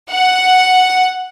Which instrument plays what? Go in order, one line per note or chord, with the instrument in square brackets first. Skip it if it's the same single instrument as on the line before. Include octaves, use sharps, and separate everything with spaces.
[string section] F#5